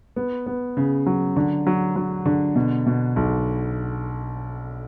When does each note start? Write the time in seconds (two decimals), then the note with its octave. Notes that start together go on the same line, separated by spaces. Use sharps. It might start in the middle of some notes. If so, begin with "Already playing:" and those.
0.16 B3
0.46 B3
0.77 C#3
1.06 F#3
1.36 D3
1.67 F#3
1.96 F#3
2.26 D3
2.55 B2
2.86 B2
3.16 B1